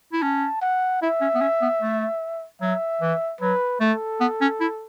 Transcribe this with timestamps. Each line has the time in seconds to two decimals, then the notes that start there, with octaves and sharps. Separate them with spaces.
0.13 E4
0.22 C#4 A5
0.62 F#5
1.02 E4 E5
1.21 C#4
1.35 B3
1.41 C#4
1.62 B3
1.82 A3
2.62 F#3 E5
3.02 E3
3.41 F#3 B4
3.81 A3 A4
4.21 B3
4.41 C#4
4.61 E4